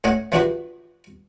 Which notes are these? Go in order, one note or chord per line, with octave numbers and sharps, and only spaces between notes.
A2 C#4 D#5 F#5 G#5
E3 F3 D4 F#4 G4 B4